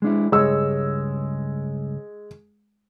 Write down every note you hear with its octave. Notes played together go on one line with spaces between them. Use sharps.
G#3 D4 E4
C#2 G2 G#3 C#5 E6